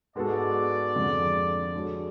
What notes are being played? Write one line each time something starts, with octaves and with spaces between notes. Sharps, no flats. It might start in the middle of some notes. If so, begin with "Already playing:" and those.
G#2 G#3 B3 F#4 A4 D5
F2 D3 F3 G#3
G#3 D4 F#4 A4 C#5